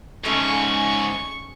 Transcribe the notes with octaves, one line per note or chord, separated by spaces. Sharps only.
G#2 C#3 A3 C#4 G#4 C#6